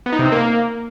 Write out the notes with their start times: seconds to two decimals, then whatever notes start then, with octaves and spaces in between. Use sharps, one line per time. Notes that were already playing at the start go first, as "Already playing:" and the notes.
0.06 B3
0.12 D#4
0.19 C3
0.25 C4
0.32 A#3